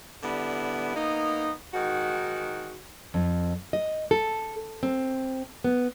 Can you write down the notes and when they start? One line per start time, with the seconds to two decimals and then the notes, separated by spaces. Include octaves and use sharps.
0.23 D3 G3 B3 E4
0.96 A#3 B3 D#4
1.73 G#2 D#3 F#4
3.14 F2
3.73 D#5
4.11 A4
4.83 C4
5.64 B3